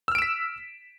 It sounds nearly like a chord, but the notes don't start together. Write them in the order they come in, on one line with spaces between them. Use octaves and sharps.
E6 F6 D7 E7 B6